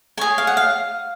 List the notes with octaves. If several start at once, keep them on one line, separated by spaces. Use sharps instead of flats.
G#4 C#5 G#5
F5
F#5
F5